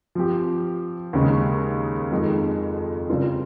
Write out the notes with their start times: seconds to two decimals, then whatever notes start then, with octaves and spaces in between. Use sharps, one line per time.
0.15 F3 C4 G4
1.13 D#2 C#3 G#3
2.11 F2 D#3 G#3
3.10 C#3 G3 C4 F4 A#4